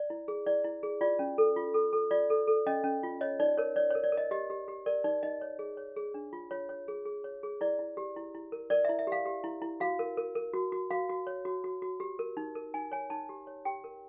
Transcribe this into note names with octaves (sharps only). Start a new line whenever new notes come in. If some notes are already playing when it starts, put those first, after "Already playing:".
Already playing: D5
E4
G#4
E4 D5
E4
G#4
F4 D5
C#4
A4
F4
A4
A4
F4 D5
A4
A4
C#4 D#5
C#4
F4
C#5 D#5
D#4 D5
A#4 C#5
C#5 D5
A#4 C#5
D5
A#4
D#5
G4 D#5
G4
G4
A#4 D5
D#4 D5
D#4 D#5
C#5
G#4
C#5
G#4
D4
F4
F4 C#5
C#5
G#4
G#4
C#5
G#4
E4 D5
E4
G4
E4
E4
A#4
A#4 D5
E5
E4
E5
G4 F5
G4
E4
E4
F#4 F5
A#4
A#4
A#4
F#4
F#4
F#4 F5
F#4
C#5
F#4
F#4
F#4
G4
A#4
D#4
A#4
D#4 G#5
C#5 G#5
D#4 A5
G4
C#5
G4 G5
A#4